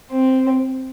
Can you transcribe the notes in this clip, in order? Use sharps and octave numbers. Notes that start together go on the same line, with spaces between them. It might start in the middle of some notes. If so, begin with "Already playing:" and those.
C4